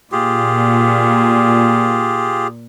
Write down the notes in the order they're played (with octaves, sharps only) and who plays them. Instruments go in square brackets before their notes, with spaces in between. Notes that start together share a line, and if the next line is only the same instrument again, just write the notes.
[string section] A#2 [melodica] F4 G4 G#4